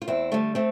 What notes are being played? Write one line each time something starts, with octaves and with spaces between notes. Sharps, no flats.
F4
E2 C4 E4
D3 G3 A3
A3 C4